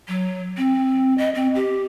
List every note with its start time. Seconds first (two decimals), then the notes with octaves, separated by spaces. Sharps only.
0.08 F#3
0.57 C4
1.18 D#5
1.35 C4
1.55 G4